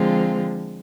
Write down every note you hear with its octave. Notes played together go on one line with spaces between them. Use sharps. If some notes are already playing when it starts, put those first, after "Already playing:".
Already playing: D3 F3 G#3 C4 F4